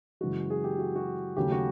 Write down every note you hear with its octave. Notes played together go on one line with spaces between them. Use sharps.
F#2 C#3 E3 G#3 F#4
G#4
G4
F#4
F#4
D#2 C#3 F#3 A3 G4
F#4